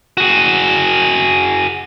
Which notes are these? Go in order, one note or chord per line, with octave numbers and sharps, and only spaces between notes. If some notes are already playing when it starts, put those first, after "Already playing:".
F#4 G#4